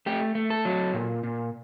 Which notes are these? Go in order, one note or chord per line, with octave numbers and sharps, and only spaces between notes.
A3 G4
A3
A4
F#3
A#2
A#2